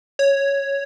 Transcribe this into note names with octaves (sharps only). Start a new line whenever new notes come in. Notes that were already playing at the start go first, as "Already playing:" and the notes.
C#5